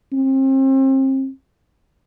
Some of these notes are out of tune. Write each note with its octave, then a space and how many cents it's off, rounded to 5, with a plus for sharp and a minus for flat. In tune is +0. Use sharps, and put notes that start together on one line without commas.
C4 +35